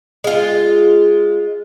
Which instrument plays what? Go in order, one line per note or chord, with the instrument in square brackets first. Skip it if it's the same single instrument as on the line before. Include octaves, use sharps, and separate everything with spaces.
[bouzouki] G#3 F4